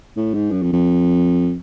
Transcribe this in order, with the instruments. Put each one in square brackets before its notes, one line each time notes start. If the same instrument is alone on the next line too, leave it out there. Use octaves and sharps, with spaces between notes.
[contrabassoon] A2
G#2
F#2
F2
F2